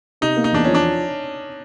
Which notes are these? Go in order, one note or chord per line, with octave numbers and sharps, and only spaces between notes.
C3 D#4
A#3
D#4
E2 D4
F3 C#4
D4